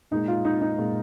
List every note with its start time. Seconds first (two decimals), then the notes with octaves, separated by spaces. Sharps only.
0.11 A#2 G#3 D#4
0.28 F4
0.45 D#4
0.61 D#4
0.78 A#2 G#3